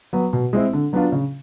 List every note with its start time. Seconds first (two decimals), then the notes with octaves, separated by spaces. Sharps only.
0.13 F#3 B3
0.33 B2
0.53 G#3 C4 E4
0.73 D3
0.93 F#3 B3 D4 F4
1.12 C#3